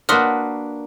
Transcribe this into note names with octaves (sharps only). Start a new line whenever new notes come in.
A#3 D4 F#4 B4 C6 D#6 F6